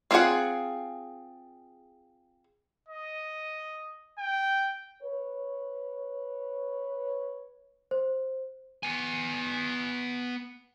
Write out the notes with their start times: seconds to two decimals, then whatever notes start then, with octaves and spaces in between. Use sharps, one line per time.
0.11 C4 C#4 F4 G#4 F#5
2.89 D#5
4.19 G5
5.02 B4 C#5
7.91 C5
8.83 B3 G#5